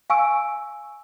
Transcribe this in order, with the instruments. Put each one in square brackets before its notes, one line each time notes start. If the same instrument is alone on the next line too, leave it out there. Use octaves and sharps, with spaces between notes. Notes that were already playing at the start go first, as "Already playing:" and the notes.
[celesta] F5 G#5 C#6 E6 D7